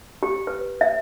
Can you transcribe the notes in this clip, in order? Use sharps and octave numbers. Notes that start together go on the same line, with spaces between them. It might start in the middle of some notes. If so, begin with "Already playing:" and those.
G4
B4
E5